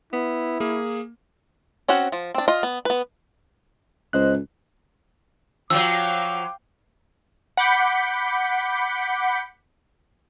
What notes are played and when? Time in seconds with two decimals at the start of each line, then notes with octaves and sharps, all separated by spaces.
0.13 B3 E4
0.60 A#3 G#4
1.88 C4 C#4 F#4 F#5
2.12 F3
2.35 C4 D4
2.48 F4 D#5
2.63 B3
2.85 B3 B4
4.13 C#2 C5 D#5 F#6
5.70 F3 F#3 F5 G5 D6 E6
7.57 F#5 B5 D6 G6 B6 C#7